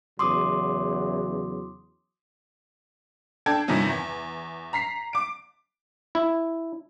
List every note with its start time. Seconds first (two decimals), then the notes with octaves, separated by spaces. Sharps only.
0.19 E2 C#3 F#3 C6 D6 D#6
3.46 D4 A4 G5 G#6
3.68 G2 C3 D#3 F3 C#4 D#4
3.89 E2
4.73 A#5 B6 C7
5.13 D6 D7
6.15 E4